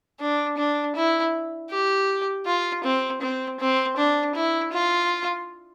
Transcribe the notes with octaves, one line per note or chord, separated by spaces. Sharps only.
D4
D4
E4
G4
F4
C4
C4
C4
D4
E4
F4